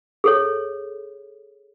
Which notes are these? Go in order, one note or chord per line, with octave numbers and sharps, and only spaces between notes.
G#4 A4 C#5